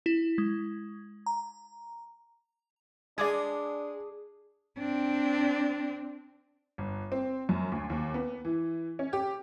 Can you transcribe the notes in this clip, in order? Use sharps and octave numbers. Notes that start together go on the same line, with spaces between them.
E4
G#3
A#5
G#3 D4 G#4 D5 D6 G#6
C4 D4
G1
C4
F#2
D2
D#2
B3
E3
C#4
G4